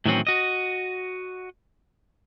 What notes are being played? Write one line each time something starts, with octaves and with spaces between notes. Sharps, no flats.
A2 D#3 E3 F#3 C4 C#4
F#4 D#5